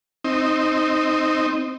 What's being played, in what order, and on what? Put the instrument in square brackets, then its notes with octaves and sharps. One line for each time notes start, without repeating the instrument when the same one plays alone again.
[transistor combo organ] C4 D#4